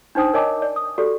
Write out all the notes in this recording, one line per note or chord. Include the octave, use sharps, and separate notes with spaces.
D4 D#4 C5 G5 D#6
A#4 C#5 D#5 G#5 A5 D6
D5
D#6
F#4 G4 A4 D5